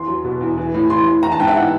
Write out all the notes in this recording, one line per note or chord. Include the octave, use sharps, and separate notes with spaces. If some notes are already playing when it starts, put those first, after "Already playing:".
Already playing: E2 C6
F#3
B2
E2
E3
A2
E3 C6
A2
E3 A#5
A5
G#2 G5
E5
E3 F#5